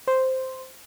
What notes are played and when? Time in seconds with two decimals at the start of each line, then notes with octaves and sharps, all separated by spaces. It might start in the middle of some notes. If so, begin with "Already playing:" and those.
0.08 C5